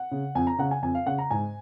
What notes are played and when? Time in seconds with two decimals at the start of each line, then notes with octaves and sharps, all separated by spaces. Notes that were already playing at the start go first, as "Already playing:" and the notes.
Already playing: F#5
0.11 C#3
0.35 F2 G#5
0.47 A#5
0.59 C#3 F#5
0.71 G#5
0.82 F2 G#5
0.95 F5
1.06 C#3 F#5
1.18 A#5
1.31 G#2 G#5